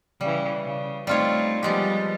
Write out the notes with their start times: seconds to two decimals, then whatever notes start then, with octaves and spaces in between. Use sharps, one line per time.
0.21 C#3 E3 G3
0.64 C#3
1.07 G3 A3 C4 D#4 F4 C#5
1.63 F3 G3 G#3 B3 G4